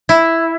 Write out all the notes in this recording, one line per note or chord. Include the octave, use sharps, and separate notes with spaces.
E4